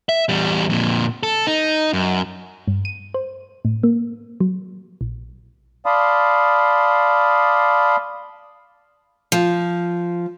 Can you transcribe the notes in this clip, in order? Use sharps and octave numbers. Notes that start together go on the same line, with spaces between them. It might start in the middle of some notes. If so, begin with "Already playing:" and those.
E5
E2 G3
F2 A#2
A4
D#4
F#2
G2
D#7
C5
A2
A#3
F#3
A#1
D5 F5 A5 B5 C6 D#6
F3